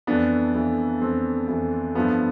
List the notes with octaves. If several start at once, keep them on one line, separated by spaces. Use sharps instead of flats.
F2 E3 A3 B3 D4
F2 E3 A3
F2 E3 A3 C4
F2 E3 A3
G2 F3 A3 B3